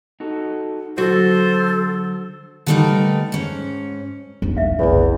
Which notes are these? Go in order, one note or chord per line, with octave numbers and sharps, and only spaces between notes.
D#4 F#4 A4
D3 F#3 F#4 A4 C5
D3 G3 A3 D#4 A#4 B4
G#2 C#4
E1 B1
E5 F5
F1 B1 E2